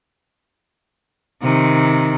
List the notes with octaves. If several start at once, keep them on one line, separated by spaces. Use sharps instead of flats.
C3 D#3